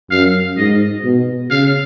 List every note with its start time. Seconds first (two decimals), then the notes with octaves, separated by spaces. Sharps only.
0.10 F#2 F5
0.57 G#2 D#5
1.04 B2
1.50 C#3 F5